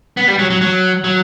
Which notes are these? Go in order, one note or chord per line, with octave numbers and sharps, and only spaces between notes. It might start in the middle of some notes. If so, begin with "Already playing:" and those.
B3
G3
F#3
F#3
F#3
F#3